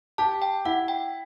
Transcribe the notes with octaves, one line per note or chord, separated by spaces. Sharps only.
G4 A5
G5
E4 F#5
G5